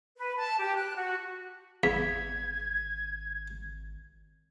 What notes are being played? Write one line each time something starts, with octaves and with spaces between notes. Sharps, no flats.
B4
A5
G4
F#6
F#4
G#1 E2 G#6 B6